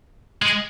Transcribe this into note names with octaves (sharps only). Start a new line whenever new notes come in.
G#3